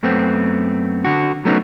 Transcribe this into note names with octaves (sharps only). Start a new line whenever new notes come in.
F#2 A3 B3 C4
D3 F#4
F#3 A3 B3 C#4 D#4